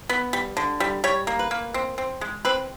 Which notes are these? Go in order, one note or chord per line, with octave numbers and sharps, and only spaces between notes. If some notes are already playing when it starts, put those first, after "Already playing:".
B3
G3
D3
G3
G3 C#5
A#3
B4
A#3
C4
C4
G#3
C4 B4